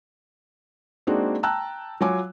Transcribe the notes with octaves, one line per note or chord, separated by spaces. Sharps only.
G#3 A#3 C4 D4 D#4 F#4
G5 A5 A#5 E6 F#6
F#3 F4 C#5 G#5 D6